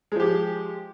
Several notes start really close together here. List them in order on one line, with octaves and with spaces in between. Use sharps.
G#3 F3 G4